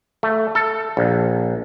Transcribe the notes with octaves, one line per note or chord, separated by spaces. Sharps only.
A3
A4
A#1